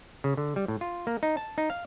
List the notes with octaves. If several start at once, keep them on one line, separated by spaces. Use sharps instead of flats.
C#3
D3
G3
A2
F4
A#3
D#4
A5
D#4
F5